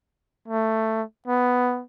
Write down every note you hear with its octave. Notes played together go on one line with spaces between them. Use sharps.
A3
B3